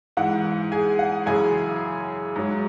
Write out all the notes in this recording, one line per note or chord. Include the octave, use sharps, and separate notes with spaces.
G#2 E3 F#5
G#4 G#5
F#5
F#2 C#3 E3 G#4 G#5
G#2 F#3